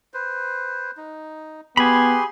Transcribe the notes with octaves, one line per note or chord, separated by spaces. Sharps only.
B4 C5
D#4
B3 G4 G#4 G#5 B5 C6